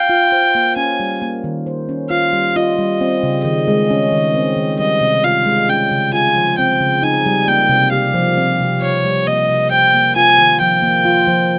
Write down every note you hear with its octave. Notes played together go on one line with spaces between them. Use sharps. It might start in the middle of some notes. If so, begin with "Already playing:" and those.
Already playing: F5 G5
F4
C5
A#3
C#4 G#5
G3
A#3
D#3
C5
C#4
F4 F5
G3
F4 D#5
G3
C4
C#3
D#3 D#5
G#3
C#4
D#3
C4
D#3
G3 D#5
C3
F4 F5
G#3
C#4 G5
C#3
F4 G#5
F3
C4 G5
C#3
D#4 G#5
G3
A#3 G5
C3
G4 F5
F3
C4
C3
C3 C#5
G3
A#3 D#5
C3
C5 G5
A#3
F4 G#5
D#3
F3 G5
A#3
F4
F3